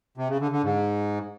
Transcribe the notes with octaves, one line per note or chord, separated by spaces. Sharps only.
C3
C#3
D3
D3
G#2